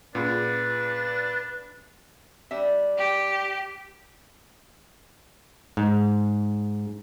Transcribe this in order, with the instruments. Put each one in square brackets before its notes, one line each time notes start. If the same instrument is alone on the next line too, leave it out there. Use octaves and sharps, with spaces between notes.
[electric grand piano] A#2 [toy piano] C#4 F4 G#4 [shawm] D4 [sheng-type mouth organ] B4
[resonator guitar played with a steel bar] G3 D4 E5
[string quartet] G4
[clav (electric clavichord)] G#2